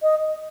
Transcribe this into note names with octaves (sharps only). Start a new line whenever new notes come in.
D#5